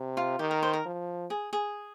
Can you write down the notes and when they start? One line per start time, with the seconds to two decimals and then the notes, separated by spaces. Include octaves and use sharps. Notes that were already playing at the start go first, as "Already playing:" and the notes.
Already playing: C3
0.17 F4
0.39 D#3 G4
0.51 A#4
0.63 C5
0.73 A#4
0.86 F3
1.30 G#4
1.53 G#4